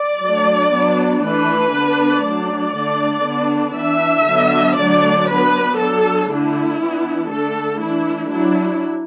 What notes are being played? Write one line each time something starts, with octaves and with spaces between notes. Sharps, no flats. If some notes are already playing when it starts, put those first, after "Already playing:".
Already playing: D5
F#3 A3 D4
F#3 B3 D4
E3 A3 D4 B4
D3 B3 D4
F#3 A3 D4 D5
D3 A3 D4
D3 B3 D4
E3 D4 E5
D3 F#3 B3 D4
D3 F#3 A3 D4 D5
F#3 B3 D4 B4
F#3 D4 A4
D3 A3 D4 E4
E3 B3 D4
D3 A3 D4 A4
E3 A3 D4 E4
F#3 D4 E4